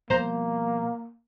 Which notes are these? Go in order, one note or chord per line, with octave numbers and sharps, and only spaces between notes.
B2 F3 G3 A#3 C5 A#5 G6